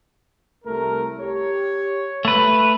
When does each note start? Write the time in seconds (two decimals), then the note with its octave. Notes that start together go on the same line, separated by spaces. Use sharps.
0.64 C2 A3 A#4
1.19 G4 C#5
2.25 A3 B4